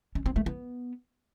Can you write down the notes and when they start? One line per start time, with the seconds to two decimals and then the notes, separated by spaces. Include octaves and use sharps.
0.15 C#4
0.26 C4
0.36 A3
0.46 B3